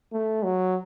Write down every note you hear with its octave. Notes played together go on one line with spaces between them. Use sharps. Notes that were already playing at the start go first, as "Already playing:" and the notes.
A3
F#3